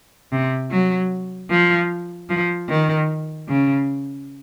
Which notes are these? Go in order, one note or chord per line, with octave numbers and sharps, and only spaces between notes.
C3
F#3
F3
F3
D#3
C#3